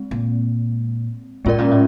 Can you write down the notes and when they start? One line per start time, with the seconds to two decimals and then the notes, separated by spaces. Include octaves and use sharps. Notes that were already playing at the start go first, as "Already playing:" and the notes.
Already playing: G#3 C4
0.11 A#2
1.45 A2 G#3 C#4 F4 A#4 D5
1.58 A#2
1.71 A2